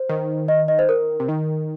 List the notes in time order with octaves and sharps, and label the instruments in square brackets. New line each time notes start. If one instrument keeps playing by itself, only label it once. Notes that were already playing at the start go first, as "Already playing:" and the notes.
Already playing: [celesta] C5
[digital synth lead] D#3
[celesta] D#5
D#5
C5
A#4
[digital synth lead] C3
D#3